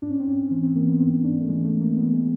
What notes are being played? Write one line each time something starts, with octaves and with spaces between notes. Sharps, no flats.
G#2 D4
C#4
C4
G#2 C#4
E3 C4
C4
E3 A#3
B3
G#2 C4
G#2 D4
A3
E3 G#3
A3
E3
A#3
E3 B3
G#3